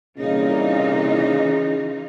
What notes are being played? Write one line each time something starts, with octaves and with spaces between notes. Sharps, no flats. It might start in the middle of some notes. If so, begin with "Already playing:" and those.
C2 A#2 C#3 E3 D#4 F4